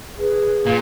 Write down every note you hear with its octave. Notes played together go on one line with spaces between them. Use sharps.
G#4 B4
A#2